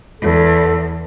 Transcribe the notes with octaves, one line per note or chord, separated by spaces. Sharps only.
E2 A4